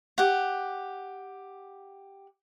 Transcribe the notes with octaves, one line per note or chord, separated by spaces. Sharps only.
G4 F#5